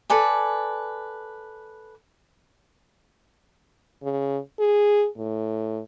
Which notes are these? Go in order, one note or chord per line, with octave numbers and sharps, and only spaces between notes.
A4 B4 D5 G#5
C#3
G#4
A2